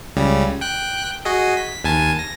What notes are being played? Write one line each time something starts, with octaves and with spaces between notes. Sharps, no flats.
C#2 C#3 G3
G5 F#6
F#4 G#4 D#5
B6
D#2 G#5 A5
A#6